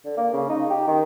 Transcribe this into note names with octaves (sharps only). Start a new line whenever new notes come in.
D3
A#3
C#3
D#4
G4
D#3